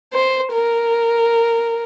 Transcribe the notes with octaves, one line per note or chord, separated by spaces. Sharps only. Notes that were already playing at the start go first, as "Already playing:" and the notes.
C5
A#4